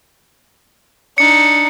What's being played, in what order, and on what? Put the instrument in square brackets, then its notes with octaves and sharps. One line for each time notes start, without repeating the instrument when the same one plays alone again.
[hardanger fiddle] D4 D#4 [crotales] C#7